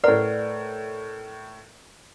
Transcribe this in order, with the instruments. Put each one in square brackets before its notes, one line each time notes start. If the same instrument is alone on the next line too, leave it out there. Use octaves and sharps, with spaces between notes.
[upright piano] A2 A#4 [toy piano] B4 D5 F#5